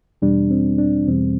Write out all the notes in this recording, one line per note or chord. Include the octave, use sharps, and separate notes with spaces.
E2 B2 G3 D4
C4
D4
E2 B2 G3 C4